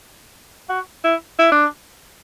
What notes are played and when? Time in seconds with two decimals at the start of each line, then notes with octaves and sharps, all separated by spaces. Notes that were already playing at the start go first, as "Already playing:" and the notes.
0.70 F#4
1.04 E4
1.39 E4
1.52 D4